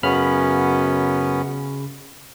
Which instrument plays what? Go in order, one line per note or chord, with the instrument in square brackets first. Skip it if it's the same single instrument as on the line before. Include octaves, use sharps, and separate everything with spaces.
[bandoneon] F#2 B3 C#4 [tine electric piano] C#3 B5 F6